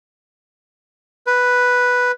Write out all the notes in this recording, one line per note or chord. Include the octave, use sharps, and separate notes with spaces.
B4